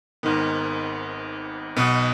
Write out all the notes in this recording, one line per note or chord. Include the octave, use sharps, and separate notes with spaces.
G#1 G#2 D#3 B3
B1 B2 B3